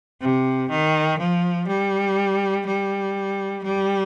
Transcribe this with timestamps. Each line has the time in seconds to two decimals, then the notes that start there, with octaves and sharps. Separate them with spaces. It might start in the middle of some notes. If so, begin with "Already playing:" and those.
0.21 C3
0.70 D#3
1.18 F3
1.68 G3
2.65 G3
3.63 G3